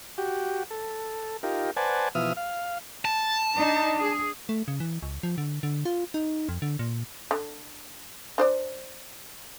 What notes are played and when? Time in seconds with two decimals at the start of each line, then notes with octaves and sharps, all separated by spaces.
0.18 F#4 G4
0.71 A4
1.43 D#4 F4 G4 A#4
1.76 B4 C5 D5 F#5 G#5 A5
2.15 B2 E3 F3 E5 D#6 F6
2.37 F5
3.05 A5
3.55 D4 D#4
4.02 G#4
4.49 A3
4.68 C#3
4.80 E3
5.03 C#2
5.23 F3
5.38 D3
5.63 D3
5.85 F4
6.14 D#4
6.49 F2
6.62 D3
6.79 A#2
7.31 D3
8.38 D4 C5 D5